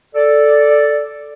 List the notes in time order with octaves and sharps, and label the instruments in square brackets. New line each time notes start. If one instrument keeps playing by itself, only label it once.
[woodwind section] A4 D5